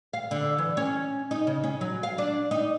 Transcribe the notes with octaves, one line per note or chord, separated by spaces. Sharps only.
F5
D3
E3
C#4
D#4
C#3
C#4
F#3
F5
D4
D#4